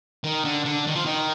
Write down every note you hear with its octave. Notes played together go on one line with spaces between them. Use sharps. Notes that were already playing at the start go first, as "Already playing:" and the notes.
D#3
D3
D3
D#3
F3
D#3